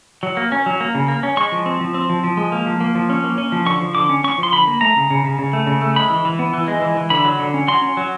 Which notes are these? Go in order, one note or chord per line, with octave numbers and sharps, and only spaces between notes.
F#3
A#3
C#4
F#3
A#3
C#3
A#3
C#4
G#3 C#6
F3
C4
F3
C4
F3
F3
G#3
A#3
F3
A#3
F3
C#4
A#3
C#4
F3
D3 C#6
F3
D3 D6
C#4
C#4 C#6
F3
C6
D3 B5
A#3
A3 A#5
C#3
C#3
C#3
C#3
A3
C#3
A3
G#3 B5
E3
E3
B3
E3
G#3
E3
E3
D3 B5
F#3
D3
C#4
F#3 C6
C#4
F#3